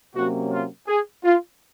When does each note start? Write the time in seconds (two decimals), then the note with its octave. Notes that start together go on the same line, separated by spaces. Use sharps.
0.15 C3 F#3 A#3 C#4 F#4
0.52 F4
0.88 G#4
1.24 F4